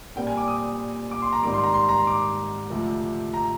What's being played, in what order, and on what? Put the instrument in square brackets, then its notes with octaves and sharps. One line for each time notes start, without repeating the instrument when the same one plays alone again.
[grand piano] A#2 G3 C4 G5
G#5
D6
D#6
D6
C6
A#5
G#2 D#3 G3 C4 D6
C6
A#5
C6
A#5
C6
D6
D2 C3 F3
A#5